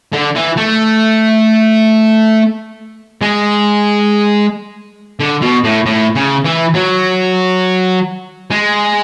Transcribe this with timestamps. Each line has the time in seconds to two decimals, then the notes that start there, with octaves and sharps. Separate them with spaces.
0.13 D3
0.36 E3
0.57 A3
3.22 G#3
5.20 D3
5.42 B2
5.64 A2
5.86 A2
6.15 C#3
6.45 E3
6.74 F#3
8.51 G#3